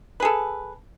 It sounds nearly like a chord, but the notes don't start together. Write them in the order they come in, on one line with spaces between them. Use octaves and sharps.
B4 G#4 A4